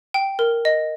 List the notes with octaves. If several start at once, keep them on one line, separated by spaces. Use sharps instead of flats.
G5
A#4
D#5